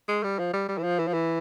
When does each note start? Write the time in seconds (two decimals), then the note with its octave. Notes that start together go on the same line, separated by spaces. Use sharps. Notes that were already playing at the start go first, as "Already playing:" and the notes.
0.08 G#3
0.23 G3
0.39 F3
0.53 G3
0.68 G3
0.78 E3
0.83 F3
0.99 E3
1.08 F3
1.14 E3